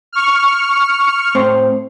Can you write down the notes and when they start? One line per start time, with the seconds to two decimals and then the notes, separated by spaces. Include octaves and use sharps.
0.13 C#6 F6
1.35 A2 C4